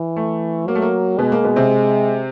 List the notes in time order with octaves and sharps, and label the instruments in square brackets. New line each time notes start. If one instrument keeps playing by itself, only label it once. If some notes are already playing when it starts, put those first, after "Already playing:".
Already playing: [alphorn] E3
[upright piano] A3
[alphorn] F#3 [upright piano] A#3
[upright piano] A3
A#3
[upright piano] B2 B3 [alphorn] G#3
[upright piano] A#3
B2 B3
C3 C4